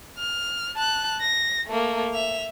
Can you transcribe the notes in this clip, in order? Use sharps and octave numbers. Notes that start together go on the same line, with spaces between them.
F6
A5 F#6
A#6
A3 A#3
E5 F7